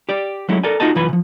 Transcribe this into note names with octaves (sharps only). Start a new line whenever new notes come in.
G4 D5
F#3 G#3 A3 C#4 E4
A4 A#4 D5 G#5
D#4 F4 F#4 G#4 D#5 A5
C2 F#2 E3 F4 B4 G#5
C3 F3